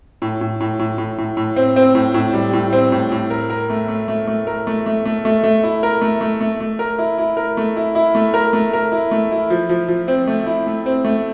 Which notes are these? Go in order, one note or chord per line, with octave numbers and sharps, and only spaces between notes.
A2
A2
A2
A2
A2
A2
A2
C4
C4
A2
A2
G3
A2
C4
A2
A2
A#4
A#4
A3
A3
A3
A3
A#4
A3
A3
A3
A3
A3
E4
A#4
A3
A3
A3
A3
A#4
E4
E4
A#4
A3
E4
E4
A3
A#4
A3
A#4
E4
A3
E4
F3
F3
F3
C4
A3
E4
A3
C4
A3